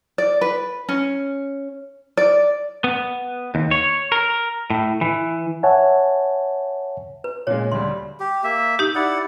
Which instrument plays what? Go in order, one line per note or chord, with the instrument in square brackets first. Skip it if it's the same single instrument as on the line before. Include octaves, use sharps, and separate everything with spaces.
[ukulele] D5
B4
C#4
D5
[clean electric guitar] B3
D#2
C#5
A#4
A2
E3
[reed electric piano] C#5 E5 F#5 G#5 A5
[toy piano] B4
[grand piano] A#2 G#3 [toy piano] C#5
[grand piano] D2 G3 [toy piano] C6
[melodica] G4
A#3 E5
[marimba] D#4 G4
[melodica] E4 D5 F#5